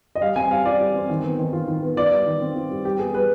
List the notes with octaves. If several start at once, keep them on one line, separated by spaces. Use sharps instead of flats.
D#5
G3 F5
C4 G#5
G3 F5
F4 D5
G3
C4
D#3
B3
D#3
F4
D#3
B3
F4 D5
G3
D#3
C4
F4
G3
G3 G4
B3 G#4
G3 B4